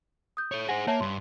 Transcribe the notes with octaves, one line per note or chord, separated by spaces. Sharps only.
D#6 G6
A4 C#5
G#4 C5 F#5 G#5 A#6
A#3 C#5 E5 A5
G2 C6